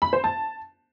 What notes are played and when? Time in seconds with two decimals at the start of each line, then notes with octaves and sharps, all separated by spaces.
0.02 B5
0.13 C5
0.24 A5